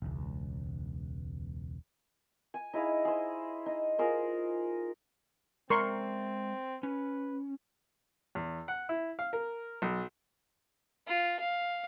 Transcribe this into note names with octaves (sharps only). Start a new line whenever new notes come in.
E1 C#2
G#5
D#4 E4 G#4 F5
G#4 C5
D#4
F4 G#4 A#4 C5
G#3 C4 A#4 D5 E5 C6 C#6
C#4 B4
E2
F#5
E4
F5
A#4
B1
F4
F5